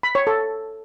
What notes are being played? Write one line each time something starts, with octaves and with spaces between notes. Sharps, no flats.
B5
C#5
A4